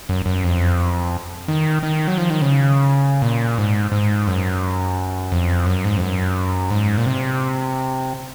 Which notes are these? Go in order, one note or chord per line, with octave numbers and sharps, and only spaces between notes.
F#2
F#2
F2
D#3
D#3
F#3
F3
D#3
C#3
A#2
G#2
G#2
F#2
F2
F#2
G#2
F2
F#2
G#2
A#2
C3